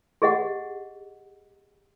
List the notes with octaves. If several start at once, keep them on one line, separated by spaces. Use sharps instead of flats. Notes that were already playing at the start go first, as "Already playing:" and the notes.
G4 G#4 D#5 F#5